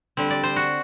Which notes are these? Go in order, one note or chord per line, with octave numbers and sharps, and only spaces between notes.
D3 G3 C4
D5
C5
F#4